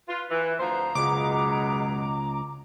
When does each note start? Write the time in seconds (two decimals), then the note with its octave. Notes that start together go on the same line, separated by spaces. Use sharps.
0.08 F4 B4
0.31 E3
0.60 D2 F3 C5 A#5
0.95 C#2 F#2 B2 G#3 D6